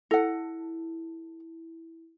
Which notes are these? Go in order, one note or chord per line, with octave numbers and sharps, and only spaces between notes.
E4 A4 F#5